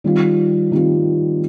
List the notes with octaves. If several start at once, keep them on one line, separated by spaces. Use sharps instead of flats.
D#3 G3 C4 F4
D#3 G3 C4 F4